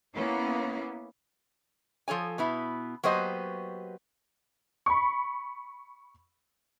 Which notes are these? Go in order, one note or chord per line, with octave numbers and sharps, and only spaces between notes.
A#3 B3 C#4 E4
F3 A4 C#5 G#5
B2 B3 E4
F#3 A#3 B3 G4 C5 D#5
B5 C#6